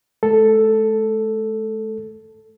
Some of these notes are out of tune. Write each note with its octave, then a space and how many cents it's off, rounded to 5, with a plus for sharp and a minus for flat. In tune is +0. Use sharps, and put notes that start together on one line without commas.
A3 -45 A4 +0